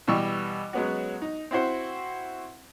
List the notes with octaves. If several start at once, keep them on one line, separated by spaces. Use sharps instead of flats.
B2 E3 G3 C#6 E6
F#3 G#3 B3 C#4 F#4
D#4
C4 E4 F#4 C5 F#5